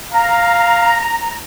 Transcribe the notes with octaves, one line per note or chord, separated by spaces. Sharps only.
F5 A#5